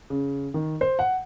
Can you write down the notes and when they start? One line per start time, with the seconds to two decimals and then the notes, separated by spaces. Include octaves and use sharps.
0.10 C#3
0.54 D#3
0.81 C5
0.99 F#5